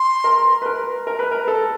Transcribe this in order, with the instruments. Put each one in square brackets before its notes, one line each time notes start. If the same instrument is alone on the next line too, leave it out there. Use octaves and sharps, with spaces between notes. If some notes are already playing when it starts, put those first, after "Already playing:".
Already playing: [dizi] C6
[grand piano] A#4
B4
A#4
A#4
B4
A#4
A4